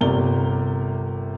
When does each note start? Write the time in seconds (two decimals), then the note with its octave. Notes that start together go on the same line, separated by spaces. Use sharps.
0.01 G1 C3 A#4 D5 G7